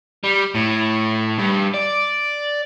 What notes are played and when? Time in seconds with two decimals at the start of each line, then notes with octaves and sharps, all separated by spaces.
0.24 G3
0.55 A2
1.38 G2
1.74 D5